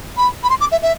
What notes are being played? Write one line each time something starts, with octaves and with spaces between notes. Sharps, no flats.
B5
B5
C6
D6
E5
E5